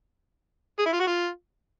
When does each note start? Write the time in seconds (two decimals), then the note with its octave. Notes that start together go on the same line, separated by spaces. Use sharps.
0.79 G#4
0.86 E4
0.93 F4
1.00 F#4
1.07 F4